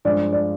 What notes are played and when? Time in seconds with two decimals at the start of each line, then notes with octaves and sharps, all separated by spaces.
0.05 G2 F3 G#3 D4 D5
0.33 D5